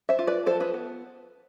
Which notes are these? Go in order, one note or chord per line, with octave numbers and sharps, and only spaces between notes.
C5 E5
F4
B4 D5
F3 A4 C5
G#4 B4
B3